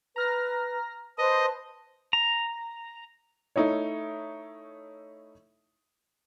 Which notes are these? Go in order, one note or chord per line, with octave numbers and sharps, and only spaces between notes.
B4 A#5 F6 A#6
B4 C5 D#5 A5
A#5
A3 D#4 E4 C#5